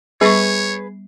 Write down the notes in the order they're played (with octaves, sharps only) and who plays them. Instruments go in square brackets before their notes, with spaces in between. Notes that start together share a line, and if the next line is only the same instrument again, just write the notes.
[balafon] G3 B3 C#6 [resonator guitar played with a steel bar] G#4 B4 [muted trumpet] C#5